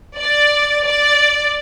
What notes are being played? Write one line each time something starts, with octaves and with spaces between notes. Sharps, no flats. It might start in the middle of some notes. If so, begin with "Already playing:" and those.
D5
D5